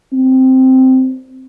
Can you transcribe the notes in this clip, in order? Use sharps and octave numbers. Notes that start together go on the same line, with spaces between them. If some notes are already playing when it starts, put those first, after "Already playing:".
C4